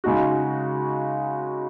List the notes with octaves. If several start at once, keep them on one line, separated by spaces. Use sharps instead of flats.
C#3 G#3 D#4 F#4